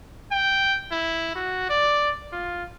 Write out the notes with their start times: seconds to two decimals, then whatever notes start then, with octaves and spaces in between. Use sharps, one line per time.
0.32 G5
0.91 E4
1.35 F#4
1.69 D5
2.33 F4